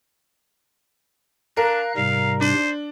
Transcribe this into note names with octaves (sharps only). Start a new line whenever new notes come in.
D4 A#4 F5 F#6
G#2 C3 G3 F5
D4 C5